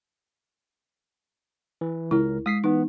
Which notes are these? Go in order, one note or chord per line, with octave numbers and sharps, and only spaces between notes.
E3
C#2 E4 A#4
G#3 D#6 B6 C7
E3 B3 D#4